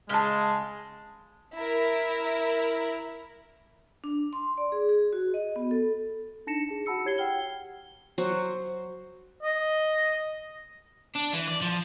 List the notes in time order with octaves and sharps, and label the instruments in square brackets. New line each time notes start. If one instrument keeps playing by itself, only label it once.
[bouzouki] C#3 A5 [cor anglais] G#3
[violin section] E4 A#4
[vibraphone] D4
C6
D5
G#4
G#4
F#4
D#5
B3
A4
[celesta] D4 D#4 A5 A#6 C#7 E7
G#4 A5
F#4 F#5 A5 B5 E6 C#7
E4 G4 C#5 G#6 C7 G7
F#5 G5 F6 G7
[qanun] F#3 F#4 C5
[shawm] D#5
[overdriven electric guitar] D4
E3
D5
F3